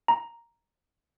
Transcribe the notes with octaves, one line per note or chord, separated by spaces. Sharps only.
A#5